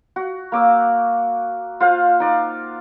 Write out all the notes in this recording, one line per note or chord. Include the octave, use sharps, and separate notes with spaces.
F#4
A#3 D6 E6
F4 C5 F5 F#5
D#4 D5